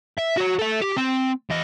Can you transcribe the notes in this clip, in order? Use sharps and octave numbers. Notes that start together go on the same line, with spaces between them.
E5
F#4 C#5
A4 E5
G4
C4
E2 D#5